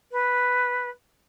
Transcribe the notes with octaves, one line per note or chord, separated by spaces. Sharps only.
B4